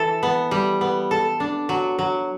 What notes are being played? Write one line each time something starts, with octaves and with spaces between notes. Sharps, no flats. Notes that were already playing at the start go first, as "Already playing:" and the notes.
Already playing: E3 A4
B3
G3
B3
A4
D4
F#3
F#3